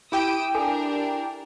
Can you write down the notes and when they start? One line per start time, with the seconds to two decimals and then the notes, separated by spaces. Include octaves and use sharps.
0.12 E4 G4 G5 D#6 E6 D7
0.55 D4 A4 A#4 G#5